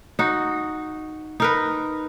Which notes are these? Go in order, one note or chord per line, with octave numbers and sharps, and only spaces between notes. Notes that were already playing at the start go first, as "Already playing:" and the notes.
D#4 F#4
D#4 A#4 B4